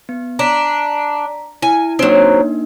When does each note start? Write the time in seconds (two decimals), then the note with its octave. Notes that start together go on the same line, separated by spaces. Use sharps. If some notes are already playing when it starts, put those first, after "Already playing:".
0.09 B3
0.39 D4 A#5 B6 D7
1.62 E4 G#5
1.99 F#3 A#3 C4 D4 D#4